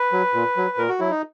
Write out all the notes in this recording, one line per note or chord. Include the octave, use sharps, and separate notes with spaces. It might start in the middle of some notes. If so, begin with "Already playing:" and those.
Already playing: B4
F#3
A#2
F#3
A#2 A#4
F#4
F#3 E4
D#4